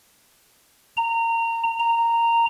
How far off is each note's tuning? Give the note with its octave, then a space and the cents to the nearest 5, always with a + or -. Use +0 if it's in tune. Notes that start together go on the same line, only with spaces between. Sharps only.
A#5 -25
A#5 -10